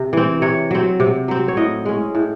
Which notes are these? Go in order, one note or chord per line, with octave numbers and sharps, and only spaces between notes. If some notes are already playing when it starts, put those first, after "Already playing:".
Already playing: C3
E3 C4
C3 C#5
F#3 C4
C3
F#3 C4
C#5
A2 D#5
G#3 C#4
A2